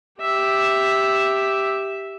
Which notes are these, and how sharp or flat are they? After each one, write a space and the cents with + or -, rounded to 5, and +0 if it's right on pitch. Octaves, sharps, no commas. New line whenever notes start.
G4 +0 E5 +0